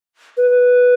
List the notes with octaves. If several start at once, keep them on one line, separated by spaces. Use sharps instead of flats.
B4